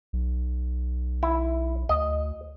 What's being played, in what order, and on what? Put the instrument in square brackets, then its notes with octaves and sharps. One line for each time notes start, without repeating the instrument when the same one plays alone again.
[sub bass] B1
[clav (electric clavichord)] E4
[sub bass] D2 [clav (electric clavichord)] D#5